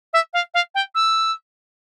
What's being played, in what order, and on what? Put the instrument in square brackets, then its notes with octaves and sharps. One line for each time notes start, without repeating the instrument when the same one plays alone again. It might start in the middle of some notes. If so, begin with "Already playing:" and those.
[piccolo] E5
F5
F5
G5
E6